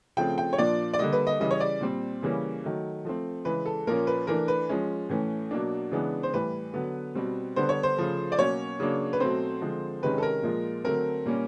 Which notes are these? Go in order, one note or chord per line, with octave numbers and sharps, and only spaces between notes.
C#3 F3 A3 C4 G5
G5
C#5
A#2 F3 A#3 D4 D5
D5
D3 G3 A#3 D#5
B4
D#5
C#3 E3 G3 D#5
C#5
D5
A#2 G3 C4
C#3 E3 G3 A#3 C#4
D#3 F#3 A3
F3 A3 C4
C#3 E3 G#3 B4
A4
A#2 F3 A#3 C#4 A#4
B4
E3 A3 D4 A#4
B4
F3 G#3 C#4
A2 E3 A3 C#4
B2 F#3 A#3 D4
C#3 E3 G#3 B3 D4
C5
A2 E3 G3 B4
D3 F#3 B3
B2 G3 C4
D3 G3 B3 D4 C5
C#5
C5
C#3 F3 A3
D5
B2 F#3 A#3 C#4 C#5
C#3 F#3 A#3 D4
B4
B2 F#3 A3 C4 C5
D3 F3 G#3 C4
C3 D#3 G#3 C#4 B4
A4
A#4
A#2 F3 G#3
D3 F#3 A3 C4 A#4
A#2 G3 A#3 C#4